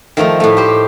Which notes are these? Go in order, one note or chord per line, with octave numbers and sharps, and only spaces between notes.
D#3 F3 A3 D#4
A2 A3
G4 C5